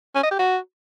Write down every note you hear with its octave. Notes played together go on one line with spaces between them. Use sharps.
C#4
D#5
G4
F#4